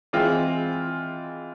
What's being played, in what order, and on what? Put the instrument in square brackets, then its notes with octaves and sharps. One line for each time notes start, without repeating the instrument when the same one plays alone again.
[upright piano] E3 G#3 C4 F4